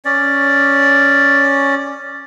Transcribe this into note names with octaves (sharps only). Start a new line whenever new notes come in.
C#4 D5